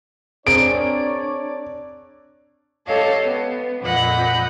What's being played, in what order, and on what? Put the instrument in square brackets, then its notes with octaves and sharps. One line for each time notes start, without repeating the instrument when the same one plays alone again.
[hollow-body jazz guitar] C4 G#4 A#4 [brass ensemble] D4 C#5 D5 [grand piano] D7
[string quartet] G4 A4 C#5 D#5 F5 A5
B3
F2 A#2 D#5 F#5 B5 G6